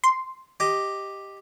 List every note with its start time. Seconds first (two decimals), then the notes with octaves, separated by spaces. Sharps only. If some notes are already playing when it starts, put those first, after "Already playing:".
0.04 C6
0.60 G4 D#5